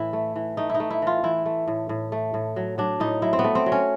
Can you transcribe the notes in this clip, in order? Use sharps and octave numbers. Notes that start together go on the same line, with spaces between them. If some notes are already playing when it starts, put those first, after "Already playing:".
Already playing: A2 E3 E4
A3
E3
A3 D#4
D#4 E4
A3
E4
E3 F4
E3 E4
A3
A2
A2
A3
A2
F#3
F#3 D4
A2 D#4
F#3 E4
C4
B3
A3
C4
F#3
C#4